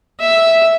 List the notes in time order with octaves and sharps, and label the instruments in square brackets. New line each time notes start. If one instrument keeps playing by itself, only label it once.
[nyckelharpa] E5